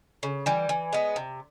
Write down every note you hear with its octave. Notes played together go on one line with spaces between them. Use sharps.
C#3
E3 G3
E3
G#3 B3
C3